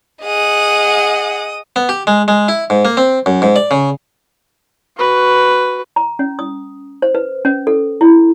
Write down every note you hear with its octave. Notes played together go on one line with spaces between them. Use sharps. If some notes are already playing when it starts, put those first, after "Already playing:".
G#4 D#5 F#5 D#6
B3
G4
G#3
G#3
E4
G#2
A#3
C4
F#2
G#2
D5
C#3
F#4 B4
A#5
C#4
D#6
C5
B4
C#4
A4
E4